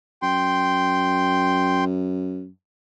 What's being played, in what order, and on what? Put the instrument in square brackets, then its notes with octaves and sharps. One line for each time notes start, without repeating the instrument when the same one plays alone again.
[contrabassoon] F#2 [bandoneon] G5 C6